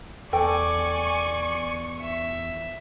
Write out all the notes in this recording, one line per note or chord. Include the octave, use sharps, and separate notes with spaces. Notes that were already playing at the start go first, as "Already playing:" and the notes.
E2 A4 D5 G5 G#5 C#6
E5